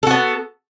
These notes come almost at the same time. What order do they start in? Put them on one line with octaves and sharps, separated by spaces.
A4 F#4 B3